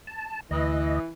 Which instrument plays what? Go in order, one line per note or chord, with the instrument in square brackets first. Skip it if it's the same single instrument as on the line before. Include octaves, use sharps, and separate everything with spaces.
[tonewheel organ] A5
[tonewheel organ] D2 D#5 [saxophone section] E3